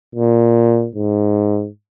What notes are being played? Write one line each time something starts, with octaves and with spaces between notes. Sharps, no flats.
A#2
G#2